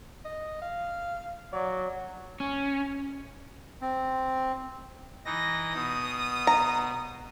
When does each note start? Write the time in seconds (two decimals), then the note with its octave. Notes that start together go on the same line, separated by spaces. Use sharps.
0.25 D#5
0.62 F5
1.53 F#3 D5
2.40 C#4
3.81 C4
5.25 E3 D#4 A#6
5.74 B2 D#6
6.47 A#5